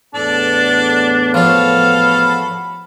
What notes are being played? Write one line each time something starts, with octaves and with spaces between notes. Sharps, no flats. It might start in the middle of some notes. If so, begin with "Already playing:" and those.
E2 A2 B3 D4 A4 D5 A5
F3 F#4 A4 C#5 F5 B5